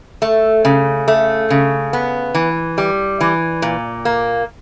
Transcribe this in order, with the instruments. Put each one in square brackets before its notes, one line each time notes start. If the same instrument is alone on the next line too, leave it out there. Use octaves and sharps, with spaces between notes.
[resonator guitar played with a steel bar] A3
C#3
A3
C#3
B3
E3
G3
E3
A#2
A#3